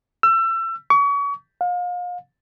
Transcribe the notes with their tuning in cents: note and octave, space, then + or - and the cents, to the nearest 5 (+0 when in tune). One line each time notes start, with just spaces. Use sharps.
E6 +30
C#6 +35
F5 +35